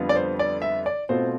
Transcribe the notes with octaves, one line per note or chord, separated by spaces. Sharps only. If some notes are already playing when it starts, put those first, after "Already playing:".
Already playing: F2 D3 G3 B3 F4
D5
C5
D5
E5
D5
B2 A3 C4 F4 C5